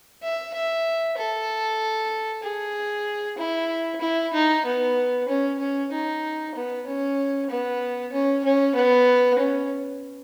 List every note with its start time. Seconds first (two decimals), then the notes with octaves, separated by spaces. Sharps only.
0.23 E5
0.54 E5
1.17 A4
2.43 G#4
3.38 E4
4.01 E4
4.33 D#4
4.65 B3
5.29 C#4
5.59 C#4
5.92 D#4
6.55 B3
6.87 C#4
7.50 B3
8.13 C#4
8.45 C#4
8.75 B3
9.39 C#4